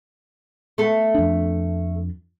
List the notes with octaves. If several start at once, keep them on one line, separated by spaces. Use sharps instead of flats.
A3 B3 A4
F2 D4